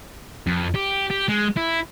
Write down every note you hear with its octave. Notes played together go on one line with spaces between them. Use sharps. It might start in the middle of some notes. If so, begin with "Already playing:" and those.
F2
G4
G4
G#3
E4